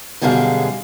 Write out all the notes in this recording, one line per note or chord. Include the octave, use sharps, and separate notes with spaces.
F#2 B2 D3 G3 G#4 F5